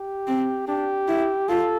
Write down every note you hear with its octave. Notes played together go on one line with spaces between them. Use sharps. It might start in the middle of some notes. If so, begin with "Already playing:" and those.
Already playing: G4
C4
D4 G4
E4
F4 A4